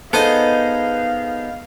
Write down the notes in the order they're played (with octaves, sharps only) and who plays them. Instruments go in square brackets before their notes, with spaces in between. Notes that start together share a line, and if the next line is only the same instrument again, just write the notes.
[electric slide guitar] B3 D#4 G#4 [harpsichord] A4 C5 D#6 [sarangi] F5